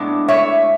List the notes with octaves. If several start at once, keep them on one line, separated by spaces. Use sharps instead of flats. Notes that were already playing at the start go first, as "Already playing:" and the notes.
Already playing: A2 G#3 B3 D4
C#5 E5